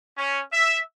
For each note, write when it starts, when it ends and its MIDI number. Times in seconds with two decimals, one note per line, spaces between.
0.18 0.40 61
0.52 0.80 76